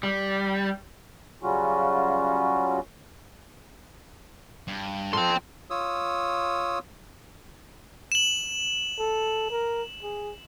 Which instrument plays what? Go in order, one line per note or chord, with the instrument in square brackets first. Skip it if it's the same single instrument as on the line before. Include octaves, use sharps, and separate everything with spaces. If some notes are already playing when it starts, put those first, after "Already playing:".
[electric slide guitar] G3
[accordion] C#3 F#3 G3 C#4 F4 F#4
[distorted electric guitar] G2
[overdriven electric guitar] F3 A4 [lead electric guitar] G5 C6
[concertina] F4 C#5 D#6 E6
[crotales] E7 F#7
[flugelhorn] A4
A#4
G#4